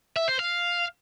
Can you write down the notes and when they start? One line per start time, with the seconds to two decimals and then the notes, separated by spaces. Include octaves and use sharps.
0.16 E5
0.28 C5
0.39 F5